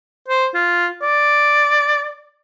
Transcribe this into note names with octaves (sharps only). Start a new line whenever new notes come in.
C5
F4
D5